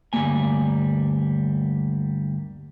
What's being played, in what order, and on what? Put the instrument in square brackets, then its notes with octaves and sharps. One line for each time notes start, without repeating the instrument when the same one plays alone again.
[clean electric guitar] D2 G2 G3 A3 A#3 G#5